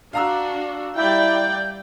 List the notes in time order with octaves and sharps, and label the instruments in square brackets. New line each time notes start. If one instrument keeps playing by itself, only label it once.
[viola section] D4 F#4 [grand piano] F5 A#5 E6
[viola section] G3 D5 G5 [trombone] E4 [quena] G6